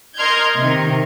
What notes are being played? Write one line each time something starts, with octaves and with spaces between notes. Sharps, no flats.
A#4 D#5 C6 F6 G6 G#6
C3 D#3